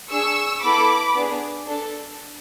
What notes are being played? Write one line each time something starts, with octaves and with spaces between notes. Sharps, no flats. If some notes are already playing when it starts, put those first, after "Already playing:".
D4 G#4 C#6 E6
B3 E4 A4 B5 D6
B3 D4 G#4
D4 A4